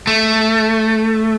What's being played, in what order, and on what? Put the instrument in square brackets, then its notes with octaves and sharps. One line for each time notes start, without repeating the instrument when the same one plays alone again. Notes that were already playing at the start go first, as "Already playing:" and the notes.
[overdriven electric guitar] A3